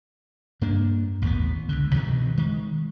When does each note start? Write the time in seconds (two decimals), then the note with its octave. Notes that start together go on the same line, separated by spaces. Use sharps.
0.61 G2 A#3 D4
1.22 A1 D#2 G3 B3
1.69 C#2 D3
1.94 G2 B2 D#3 E3
2.37 D#3 G#3